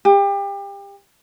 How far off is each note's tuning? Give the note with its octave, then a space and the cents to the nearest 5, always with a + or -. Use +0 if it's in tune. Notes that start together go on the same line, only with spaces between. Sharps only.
G4 +30